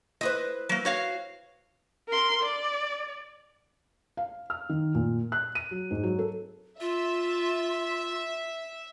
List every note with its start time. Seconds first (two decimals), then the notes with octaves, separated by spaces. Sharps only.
0.21 E4 B4 C5 D#5
0.69 F#3 A#3
0.85 F#4 C#5 F5
2.08 A#4 C6
2.42 D5
4.17 F5
4.50 F6
4.69 D#3
4.95 A#2
5.32 F#6
5.55 D#7
5.71 F#3
5.91 G#2
6.03 F#3
6.19 A4
6.80 F4 E5